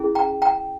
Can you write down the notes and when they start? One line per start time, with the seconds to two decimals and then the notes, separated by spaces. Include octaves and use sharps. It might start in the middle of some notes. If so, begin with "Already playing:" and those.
Already playing: C#4 E4 G#4
0.15 G5 A#5
0.42 G5 A#5